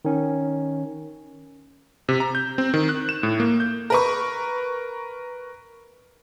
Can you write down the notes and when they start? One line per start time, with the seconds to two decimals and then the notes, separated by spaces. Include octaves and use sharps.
0.05 D#3 C#4
2.09 C3
2.20 A#5
2.35 G6
2.58 C4
2.74 D#3
2.89 F#6
3.09 E7
3.23 A2
3.40 A#3
3.60 G6
3.90 A#4 B4 C#6